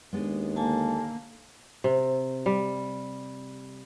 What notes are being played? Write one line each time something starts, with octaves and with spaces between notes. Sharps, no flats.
D#2 G#3 B3 D4
D3 A#3 A4 G#5 A5
C3
G3